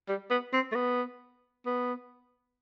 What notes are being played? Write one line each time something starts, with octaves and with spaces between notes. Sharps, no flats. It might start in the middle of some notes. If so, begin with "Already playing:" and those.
G3
B3
C4
A3
B3
B3